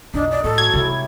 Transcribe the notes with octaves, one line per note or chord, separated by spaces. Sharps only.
B1 F2 D4 D#4 G#4
G#4 D5
A2 F#4 A4
E3 F#3 G#6
C3 G3 G#3 E4
C#5